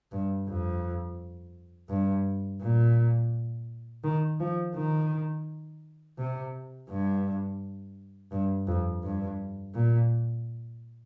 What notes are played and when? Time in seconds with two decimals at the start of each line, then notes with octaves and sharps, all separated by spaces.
0.12 G2
0.48 F2
1.90 G2
2.61 A#2
4.04 D#3
4.40 F3
4.75 D#3
6.18 C3
6.89 G2
8.32 G2
8.67 F2
9.03 G2
9.74 A#2